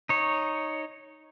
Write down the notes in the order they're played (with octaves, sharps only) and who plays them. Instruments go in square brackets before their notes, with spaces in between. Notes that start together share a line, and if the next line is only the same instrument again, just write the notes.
[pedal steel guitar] D#4 C#5